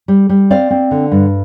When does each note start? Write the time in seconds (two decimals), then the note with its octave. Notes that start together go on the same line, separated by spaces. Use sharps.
0.08 G3
0.29 G3
0.50 C4 D5 F5
0.71 C4
0.91 D3
1.12 G2